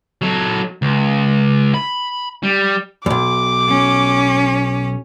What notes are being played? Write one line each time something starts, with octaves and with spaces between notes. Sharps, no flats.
F#3 A4
C#2
B5
G3
B1 E2 D6
C#4